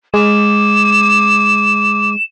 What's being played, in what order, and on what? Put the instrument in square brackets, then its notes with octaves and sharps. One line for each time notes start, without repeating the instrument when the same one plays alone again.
[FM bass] G#3 [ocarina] D6 [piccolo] E7